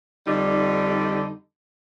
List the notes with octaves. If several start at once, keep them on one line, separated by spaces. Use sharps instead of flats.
F2 D3 G3 D#4